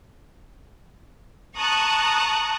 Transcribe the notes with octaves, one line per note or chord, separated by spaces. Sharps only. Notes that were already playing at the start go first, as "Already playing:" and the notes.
A5 A#5 C#6 D#6 F#6